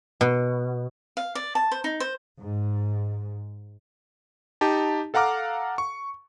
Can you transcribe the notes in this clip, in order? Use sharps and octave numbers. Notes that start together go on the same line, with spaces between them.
B2
F5
D5
A5
C5
D#4
C5
G#2
D#4 G4 A5
A4 F5 F#5 A#5 D6 F6
C#6